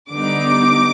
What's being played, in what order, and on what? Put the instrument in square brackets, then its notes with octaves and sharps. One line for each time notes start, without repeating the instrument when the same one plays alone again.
[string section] D3 G3 B3 D#4 D6